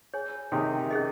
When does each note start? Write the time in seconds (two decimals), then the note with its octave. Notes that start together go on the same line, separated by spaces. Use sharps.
0.14 G#4 C#5 G#5
0.52 C3 D#3 G#4 C#5 G#5
0.90 C#4 G#4 D#5